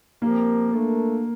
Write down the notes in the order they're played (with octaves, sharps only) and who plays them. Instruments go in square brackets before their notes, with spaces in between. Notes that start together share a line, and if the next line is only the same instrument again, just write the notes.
[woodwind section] A#2 F3 C4 G4 A#4 [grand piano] A#3
[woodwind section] A#2 A3 D4 A4